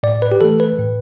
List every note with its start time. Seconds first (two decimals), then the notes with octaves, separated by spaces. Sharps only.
0.03 A2 D5
0.22 B4
0.32 G4
0.41 E3 A3 A4
0.60 B4
0.78 A2